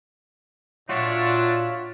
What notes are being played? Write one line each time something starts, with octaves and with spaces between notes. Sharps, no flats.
A#2 D4 F4 F#4 C#5 D5 E5